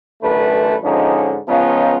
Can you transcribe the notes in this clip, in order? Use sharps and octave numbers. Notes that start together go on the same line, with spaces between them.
A1 F#2 D3 A3 B4
G#2 D3 F3 C#4 D#4
C#2 F3 B3 C#4 D#4 F4